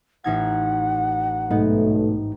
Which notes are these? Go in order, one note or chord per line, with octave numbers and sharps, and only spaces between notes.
A1 D#4 F#5 G#6
B1 G#2 A3 B3 D#4